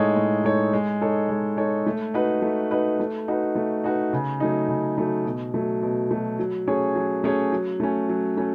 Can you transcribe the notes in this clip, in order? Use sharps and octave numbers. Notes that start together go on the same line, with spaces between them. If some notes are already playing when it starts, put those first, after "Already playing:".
Already playing: A2 G#3 D#4 A4 C#5
A2
G#3 D#4 A4 C#5
G#3
D#4 A4 C#5
G#3
D#4 A4 C#5
A3
D#4 F#4 B4
A3
D#4 F#4 B4
A3
D#4 F#4 B4
A3
D#4 F#4 B4
C#3
F#3 A3 D#4
C#3
F#3 A3 D#4
B2
F#3 A3
B2
F#3 A3
F#3
A3 C#4 G#4 C#5
F#3
A3 C#4 G#4 C#5
F#3
A3 C#4
F#3
A3 C#4